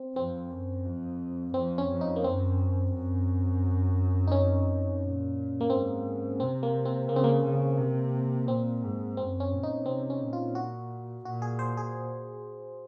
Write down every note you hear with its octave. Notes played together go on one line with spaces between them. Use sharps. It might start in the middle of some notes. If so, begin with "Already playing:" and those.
Already playing: C4
F2 C4
F#2
F2
F2 C4
C#4
F2
D#4
A#3
F#2 C4
F#2
D#4
C#4
A#2
A#3
G#2 C4
C3 C4
A#3
C4
C#3 A#3
C4
A#3
C#3
C3
A#2 C4
G#2
F#2 C4
C#4
A#2
D#4
C3 C4
C#4
A#2
F4
F#4
A#2 F#4
G#4
C5
G#4